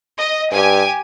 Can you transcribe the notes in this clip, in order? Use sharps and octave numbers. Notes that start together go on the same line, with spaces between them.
D#5
G2 G4 G#5